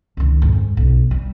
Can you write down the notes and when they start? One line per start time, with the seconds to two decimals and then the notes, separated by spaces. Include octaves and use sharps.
0.17 C#2 D#3
0.42 F2 G#2
0.77 B1
1.11 G3